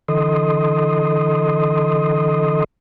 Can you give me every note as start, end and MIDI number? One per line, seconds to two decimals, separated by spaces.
0.08 2.64 50
0.08 2.64 52
0.08 2.64 69
0.08 2.64 75
0.08 2.64 84
0.08 2.64 87